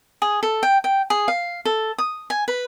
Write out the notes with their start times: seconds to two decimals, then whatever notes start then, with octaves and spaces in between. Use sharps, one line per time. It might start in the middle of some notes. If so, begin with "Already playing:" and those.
0.22 G#4
0.43 A4
0.63 G5
0.84 G5
1.10 G#4
1.28 F5
1.65 A4
1.98 D#6
2.30 G#5
2.48 B4